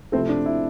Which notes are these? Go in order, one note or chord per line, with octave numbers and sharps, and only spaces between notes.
C3 F3 A3 C4 E4 A4
D4
E4